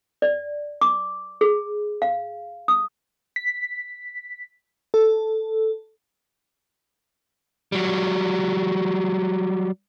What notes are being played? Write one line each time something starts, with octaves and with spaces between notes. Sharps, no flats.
D5
D6
G#4
F5
D#6
B6
A4
F#3 G3